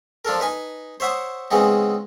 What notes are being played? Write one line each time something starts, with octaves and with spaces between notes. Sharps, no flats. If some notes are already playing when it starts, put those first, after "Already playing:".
F3 D4 A4 A#4
D#4 B4 G#5
C5 C#5 E5 F#5 D#6
C#3 E3 G#3 B3 C4 D#4